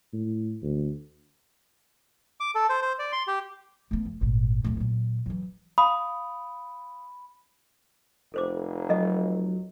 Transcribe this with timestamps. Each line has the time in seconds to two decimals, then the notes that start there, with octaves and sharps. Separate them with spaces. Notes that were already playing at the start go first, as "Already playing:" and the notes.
0.13 A2
0.62 D2
2.40 D6
2.55 A4
2.70 C5
2.82 C5
2.99 D5
3.12 C6
3.28 G4
3.91 A3 B3
4.05 F1
4.21 G#1 A#2
4.64 D1 D2
4.77 A#2 F#3
5.26 E3 F#3
5.78 F5 B5 D#6
8.34 F1 A4 C5 D6
8.90 F#3 A4 D#5